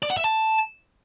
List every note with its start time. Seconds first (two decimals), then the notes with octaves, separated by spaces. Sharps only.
0.03 D5
0.10 F#5
0.17 E5
0.24 A5